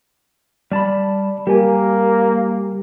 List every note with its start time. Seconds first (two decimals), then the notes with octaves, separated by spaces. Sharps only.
0.71 G3 D5 A5 B5
1.47 G3 A#3 G4 A#4 G#5